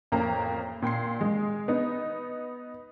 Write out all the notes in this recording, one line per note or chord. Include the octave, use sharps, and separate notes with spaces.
A1 F2 A#3 A#5
A#2 G5 C6 C7
G#3
B3 D#4